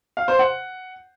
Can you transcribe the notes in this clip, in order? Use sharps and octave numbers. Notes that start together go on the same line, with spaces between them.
F5
C5
F#5